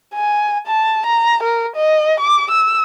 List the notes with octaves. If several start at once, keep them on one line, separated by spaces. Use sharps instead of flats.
G#5
A5
A#5
A#4
D#5
D6
E6